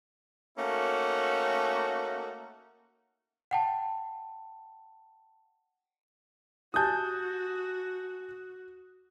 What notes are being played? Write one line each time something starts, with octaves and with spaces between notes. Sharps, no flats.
A3 A#3 C#4 D#4 F#4
F#5 G5 A5
F#4 G4 G#5 A5 D#6 G6